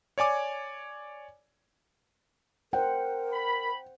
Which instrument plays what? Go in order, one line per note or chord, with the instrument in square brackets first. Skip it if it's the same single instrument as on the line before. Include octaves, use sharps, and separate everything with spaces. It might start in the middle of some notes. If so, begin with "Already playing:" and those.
[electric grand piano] C#5 D5 G#5 D6
[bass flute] A#4 [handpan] C5 F#5 [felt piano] G5
[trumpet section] B5